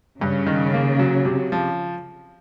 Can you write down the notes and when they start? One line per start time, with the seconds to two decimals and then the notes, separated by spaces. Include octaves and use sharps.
0.21 G2 C#3
0.46 D#3
0.74 A#3
0.99 F#3
1.25 C3
1.52 F3